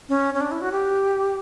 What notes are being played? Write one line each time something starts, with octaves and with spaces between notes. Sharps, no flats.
C#4
C#4
D4
E4
F#4
G4